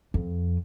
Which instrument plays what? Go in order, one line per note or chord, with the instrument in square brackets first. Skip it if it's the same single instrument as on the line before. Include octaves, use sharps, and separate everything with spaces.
[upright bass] F2